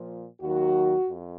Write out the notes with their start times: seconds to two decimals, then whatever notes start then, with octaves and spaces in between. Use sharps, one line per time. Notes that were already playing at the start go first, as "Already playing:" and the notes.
Already playing: A#2 F3
0.41 D#2 D#3 F#3 F#4
1.09 F2